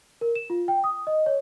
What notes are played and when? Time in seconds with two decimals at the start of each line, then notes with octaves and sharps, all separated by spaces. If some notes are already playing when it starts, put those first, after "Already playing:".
0.21 A#4
0.35 E7
0.50 F4
0.68 G5
0.84 D#6
1.07 D#5
1.26 C#5